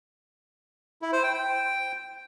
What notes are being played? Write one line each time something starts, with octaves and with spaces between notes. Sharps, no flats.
E4
C5
G5
G5